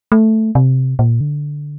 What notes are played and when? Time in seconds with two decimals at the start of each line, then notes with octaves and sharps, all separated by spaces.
0.12 A3
0.55 C3
0.99 A#2
1.21 D3